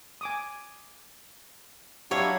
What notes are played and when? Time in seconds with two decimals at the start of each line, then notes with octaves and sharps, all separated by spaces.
0.21 G#5 D6 D#6
2.11 F#3 D4 E4 G4 C#5 F5